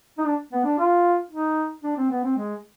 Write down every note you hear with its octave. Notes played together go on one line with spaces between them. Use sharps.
D#4
D4
B3
D4
F4
D#4
D4
C4
B3
C4
G#3